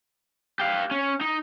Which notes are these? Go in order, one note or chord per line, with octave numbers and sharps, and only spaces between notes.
G4 F5
C#4
D#4